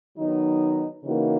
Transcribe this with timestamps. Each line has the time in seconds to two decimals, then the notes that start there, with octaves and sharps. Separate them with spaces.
0.17 D#3 F#3 B3 D#4
1.04 C#3 E3 A#3 D#4 F#4